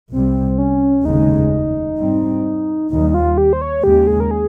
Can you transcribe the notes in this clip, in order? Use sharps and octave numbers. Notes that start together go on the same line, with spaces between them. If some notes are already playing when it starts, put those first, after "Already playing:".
C2 C3 G3 C4
C#4
F1 D#2 C#3 G#3 D#4
G#2 G3 C4
D#2 D#3 G3 D#4
D#4
F4
G4
C5
C#5
D#2 C#3 G#3 G4
G#4
A#4
G#4